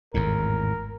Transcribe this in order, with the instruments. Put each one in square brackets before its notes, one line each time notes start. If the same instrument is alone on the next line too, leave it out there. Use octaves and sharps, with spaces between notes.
[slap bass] G#1 E2 A2 [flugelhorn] A#4